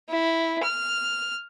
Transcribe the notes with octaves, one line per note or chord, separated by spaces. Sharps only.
E4
F6